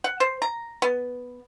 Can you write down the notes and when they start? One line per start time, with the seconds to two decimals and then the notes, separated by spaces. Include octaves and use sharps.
0.04 F#5
0.20 C5
0.42 A#5
0.82 B3